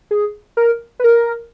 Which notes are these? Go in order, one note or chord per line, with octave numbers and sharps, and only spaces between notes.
G#4
A#4
B4
A#4